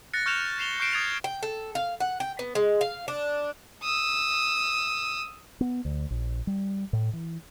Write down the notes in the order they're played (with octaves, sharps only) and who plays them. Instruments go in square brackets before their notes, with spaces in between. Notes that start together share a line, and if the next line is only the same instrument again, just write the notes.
[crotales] F#6 A6 A#6 C#7
C#6 F6 G6 C#7 E7 F7
A6 C7 E7 F7 G7
C#6 F#6 G6 C7 D7 E7
D#6 G#6 A6 D7 F7
[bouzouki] G5
A4
F5
F#5
G5
B3
G#3
F5
D4
[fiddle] D#6 E6
[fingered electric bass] B3
D2
A#1
G3
A2
E3